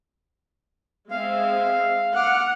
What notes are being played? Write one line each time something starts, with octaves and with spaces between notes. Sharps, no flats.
G#3 C4 E5 F5
F#5 D6 F6